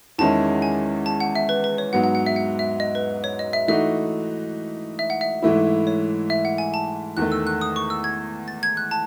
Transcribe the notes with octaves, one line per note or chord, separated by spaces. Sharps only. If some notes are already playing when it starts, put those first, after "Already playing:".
E2 D#3 G#3 C#4 E4 A5
G#5
A5
F#5
E5
B4
B4
C#5
G#2 F#3 B3 F#4 F#5
F#5
F#5
E5
F#5
E5
D#5
B4
C#5
D#5
E5
E3 A3 D#4 F#4 E5
E5
F#5
E5
G#2 E3 A3 E4
C#5
E5
F#5
G#5
A5
E2 D#3 A3 F#6
E6
F#6
D#6
C#6
E6
G#6
A6
G#6
F#6
A5